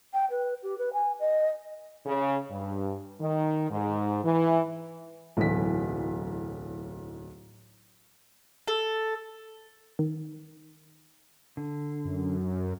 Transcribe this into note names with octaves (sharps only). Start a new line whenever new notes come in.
G5
B4
G4
B4
G#5
D#5
C#3
G2
D#3
G#2
E3
D1 B1 E3 B6
A4
D#3
D3
F#2